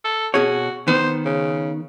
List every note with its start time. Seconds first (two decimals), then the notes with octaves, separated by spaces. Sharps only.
0.05 A4
0.34 B2 F#4 G#4 C#5
0.88 D#3 B3 C5
1.25 C#3